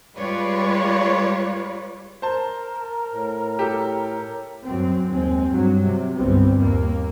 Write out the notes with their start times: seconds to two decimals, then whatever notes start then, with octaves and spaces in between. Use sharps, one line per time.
0.15 G3 G#3 F4 B4 C#5 D5
2.22 A#4 C5 A5
3.12 A2
3.59 G4 A4
4.64 F#2 C4
5.09 D#2 G#3 C4
5.49 G2 F#3
5.85 C3
6.16 G1 C2 G3 B3 C4
6.58 D#2 A#3